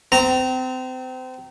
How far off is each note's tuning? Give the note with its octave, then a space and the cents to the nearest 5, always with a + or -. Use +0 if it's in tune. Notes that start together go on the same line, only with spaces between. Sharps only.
C4 -30 A#5 -10